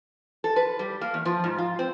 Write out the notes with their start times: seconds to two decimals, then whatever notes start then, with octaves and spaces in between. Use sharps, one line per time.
0.44 A4
0.56 B4
0.79 G3
1.01 A#3
1.14 E2
1.25 F3
1.44 G#2
1.58 F4
1.79 C4